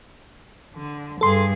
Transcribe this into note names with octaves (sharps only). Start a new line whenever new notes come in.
D3
G2 G#4 A4 C6